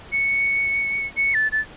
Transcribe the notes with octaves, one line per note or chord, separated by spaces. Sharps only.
C#7
C#7
A6
A6